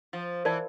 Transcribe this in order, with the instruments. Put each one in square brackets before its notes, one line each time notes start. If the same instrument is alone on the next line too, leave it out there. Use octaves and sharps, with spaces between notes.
[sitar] F3
[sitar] E3 [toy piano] A#4 D5 A5